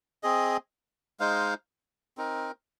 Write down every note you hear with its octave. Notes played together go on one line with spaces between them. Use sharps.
C4 G#4 D#5
G#3 D#4 C5 F5
C4 D#4 A#4